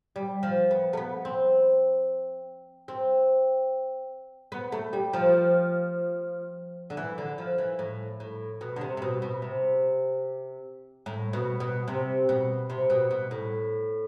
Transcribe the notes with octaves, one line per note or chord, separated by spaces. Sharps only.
G3
F3
B3
A3
B3
C4
C4
B3
A3
G3
F3
D3
E3
D3
F3
E3
A2
A2
B2
D3
C3
C3
B2
B2
C3
A2
B2
B2
C3
B2
C3
B2
B2
A2